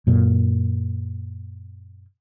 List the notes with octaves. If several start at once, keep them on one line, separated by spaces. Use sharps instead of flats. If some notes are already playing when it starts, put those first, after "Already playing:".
F#2 A#2